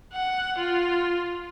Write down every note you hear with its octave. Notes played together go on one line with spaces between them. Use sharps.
F#5
F4